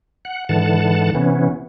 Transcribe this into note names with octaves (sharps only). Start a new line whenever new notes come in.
F#5
G#2 D3 E3 F#5 A5
C3 E3 B3 C#4